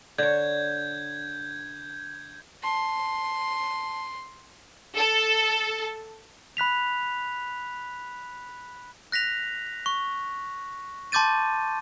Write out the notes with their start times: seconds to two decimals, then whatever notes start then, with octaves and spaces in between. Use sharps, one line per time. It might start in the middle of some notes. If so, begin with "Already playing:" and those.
0.18 D3 C#5 G6 G#6
2.63 A5 C6
4.96 A4
6.57 B5 F#6 B6 F7
9.12 F#6 A#6 B6 F7
9.86 C#6
11.12 A5 C6 D6 G6 A6 D#7